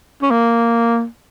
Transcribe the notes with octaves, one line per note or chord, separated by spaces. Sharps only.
C#4
A#3